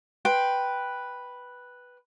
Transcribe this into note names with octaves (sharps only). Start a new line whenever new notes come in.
B4 G5 C6